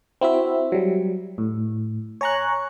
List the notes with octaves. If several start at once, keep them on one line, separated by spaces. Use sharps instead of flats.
C4 E4 F#4 E5
F#3 G3
A2
C#5 G#5 A#5 C#6 F#6